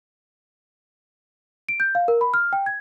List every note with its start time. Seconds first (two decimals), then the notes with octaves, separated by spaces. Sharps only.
1.69 D7
1.80 G6
1.95 F5
2.08 A#4
2.21 B5
2.34 F6
2.53 G5
2.66 G#6